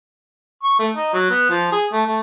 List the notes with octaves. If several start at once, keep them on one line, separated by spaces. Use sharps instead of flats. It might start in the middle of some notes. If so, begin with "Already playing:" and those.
C#6
A3
D#4
F#3
B3
F3
G#4
A3
A3